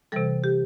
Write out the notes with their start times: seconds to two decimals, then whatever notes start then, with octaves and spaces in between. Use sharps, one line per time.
0.12 C3 E3 G3 A4
0.44 G4